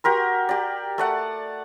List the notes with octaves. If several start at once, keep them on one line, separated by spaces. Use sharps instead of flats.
F#4 G4 A#4 C6
G4 D5
A3 D5 F#5